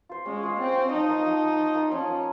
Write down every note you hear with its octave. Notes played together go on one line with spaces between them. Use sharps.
F4 C5
G#3 C#4
F4 C5
C4 C#4
F4 C5
F3 D#4
A#3 F4
F3
A#3
F4
F3
A#3 F4
F3 C#4
A#3 F4